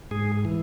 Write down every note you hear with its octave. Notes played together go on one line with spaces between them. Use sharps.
G#2 G#4
E3